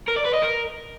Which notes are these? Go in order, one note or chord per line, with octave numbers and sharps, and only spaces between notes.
A#4
D5
B4
D#5
A#4